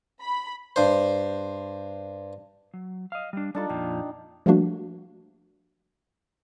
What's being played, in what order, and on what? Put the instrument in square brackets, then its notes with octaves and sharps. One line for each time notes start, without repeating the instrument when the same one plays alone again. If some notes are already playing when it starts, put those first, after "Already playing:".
[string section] B5
[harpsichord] G2 C5
[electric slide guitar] F#3
D#5 F5
G3 D4
[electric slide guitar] G3 A4 [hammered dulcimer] D4 D#4 F4
[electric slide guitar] F2 A#2 F3 [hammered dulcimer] G5
[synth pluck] F3 G3 A3 A#3 D4 F#4